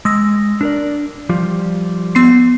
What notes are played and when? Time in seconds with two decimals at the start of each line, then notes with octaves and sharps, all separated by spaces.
0.05 G#3 D#6 E6 A#6
0.61 D4 A#4 D5
1.29 F3 G3 F4
2.15 B3 C6 C7